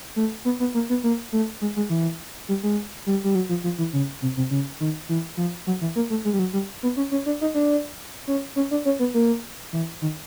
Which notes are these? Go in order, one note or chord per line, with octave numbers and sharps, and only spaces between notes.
A3
B3
B3
A#3
B3
A#3
A3
G#3
G#3
E3
G3
G#3
G3
G3
F#3
F3
F3
E3
C#3
C3
C3
C#3
D#3
E3
F3
F#3
E3
A#3
A3
G#3
G3
F#3
G3
B3
C#4
C#4
D4
D#4
D4
C#4
C#4
D4
C#4
B3
A#3
E3
D#3